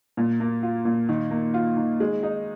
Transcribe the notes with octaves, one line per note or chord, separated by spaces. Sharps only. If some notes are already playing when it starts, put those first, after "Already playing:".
A#2
A#3
F4
A#2
D#3
A#3
F4
D#3
G#3
D#4